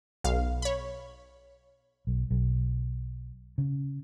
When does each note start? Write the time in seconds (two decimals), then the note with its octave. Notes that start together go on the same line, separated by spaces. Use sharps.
0.24 B1 F5
0.62 C#5 B5
2.07 B1
2.31 B1
3.58 C#3